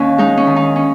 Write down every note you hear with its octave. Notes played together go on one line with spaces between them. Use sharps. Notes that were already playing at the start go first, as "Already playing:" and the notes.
Already playing: D#2 C#4
G#3 D#4
C#4
D#3
D#4
C#4